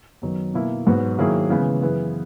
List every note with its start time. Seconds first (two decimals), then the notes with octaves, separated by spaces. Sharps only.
0.22 F#2 D#3 F#3 B3 D#4
0.54 B2 A#3 E4
0.86 G#2 F#3 B3 F#4
1.19 D#3 F#3 A#3 E4 G#4
1.50 C#3 E3 G#3 B3
1.82 F#2 E3 B3 E4 G#4